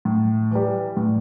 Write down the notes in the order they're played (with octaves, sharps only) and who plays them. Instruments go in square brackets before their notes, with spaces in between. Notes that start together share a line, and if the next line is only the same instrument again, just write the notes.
[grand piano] A2
E3 G3
A2